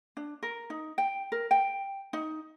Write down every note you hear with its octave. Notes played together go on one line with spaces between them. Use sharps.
D4
A#4
D#4
G5
A#4
G5
D#4